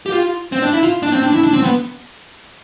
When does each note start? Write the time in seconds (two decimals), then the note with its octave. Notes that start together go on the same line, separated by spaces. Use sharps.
0.06 G4
0.12 F4
0.52 C4
0.62 D4
0.73 E4
0.83 F4
1.03 D4
1.12 C4
1.23 D4
1.33 E4
1.43 D4
1.53 C4
1.63 B3